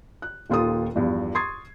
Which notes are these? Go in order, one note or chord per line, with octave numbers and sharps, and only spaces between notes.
F#6
D#1 D#2 F4 A4 D#6
E2 G2 F3
C6 C#6 D#6 G#6 A6 C7